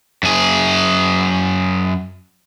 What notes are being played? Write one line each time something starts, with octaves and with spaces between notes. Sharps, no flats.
F#2 G#4